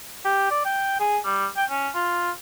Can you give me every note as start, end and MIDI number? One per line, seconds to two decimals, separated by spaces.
0.25 0.46 67
0.50 0.60 74
0.65 0.99 79
0.99 1.18 68
1.25 1.46 55
1.57 1.65 79
1.70 1.89 61
1.94 2.31 65